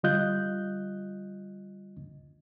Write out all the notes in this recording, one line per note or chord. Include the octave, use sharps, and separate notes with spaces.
D3 G3 F4 D#5 F#6 G6